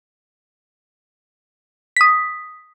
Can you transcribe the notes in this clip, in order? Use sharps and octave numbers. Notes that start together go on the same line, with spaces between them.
D#6 B6